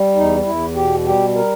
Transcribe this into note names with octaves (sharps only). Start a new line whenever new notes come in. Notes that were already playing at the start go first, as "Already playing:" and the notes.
Already playing: G3
E2 D#4
E2 E4
B2 G4
G3 G4
A#4